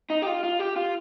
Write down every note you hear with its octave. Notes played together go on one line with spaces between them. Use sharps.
D#4
G4
F4
F4
G4
F4